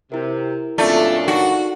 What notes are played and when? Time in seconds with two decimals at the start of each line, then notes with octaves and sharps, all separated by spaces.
0.12 C3 E4 A#4
0.78 F#2 A#2 A3 C4 D4 F4 D5
1.28 D#4 F#4